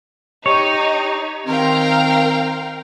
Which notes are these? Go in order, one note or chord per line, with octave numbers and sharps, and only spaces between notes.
D#4 G4 C#5
D#3 C4 A#4 F5 G5